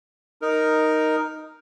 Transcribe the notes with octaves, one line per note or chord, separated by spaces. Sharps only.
D#4 A#4